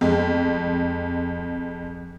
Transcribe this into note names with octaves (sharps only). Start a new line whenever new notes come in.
F2 G#3